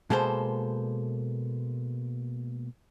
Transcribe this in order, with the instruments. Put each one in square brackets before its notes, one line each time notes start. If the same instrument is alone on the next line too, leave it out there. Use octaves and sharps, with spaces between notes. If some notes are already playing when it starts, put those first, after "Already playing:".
[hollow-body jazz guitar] B2 G#3 A#3 A4 C5